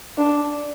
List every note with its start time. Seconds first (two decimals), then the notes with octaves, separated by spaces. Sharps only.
0.18 D4